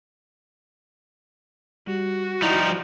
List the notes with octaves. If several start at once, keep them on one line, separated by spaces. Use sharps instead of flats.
G3 F#4
F3 G3 D#4 E4